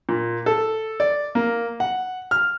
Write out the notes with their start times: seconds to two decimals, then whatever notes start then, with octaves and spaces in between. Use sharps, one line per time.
0.09 A#2
0.46 A4
1.00 D5
1.35 A#3
1.80 F#5
2.31 F6